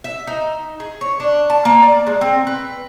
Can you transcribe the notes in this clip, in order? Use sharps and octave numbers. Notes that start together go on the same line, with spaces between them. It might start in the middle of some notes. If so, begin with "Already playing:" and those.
E5
D#4
G#4
C#5
D4
A5
A#3
D5
G#3
C4
B4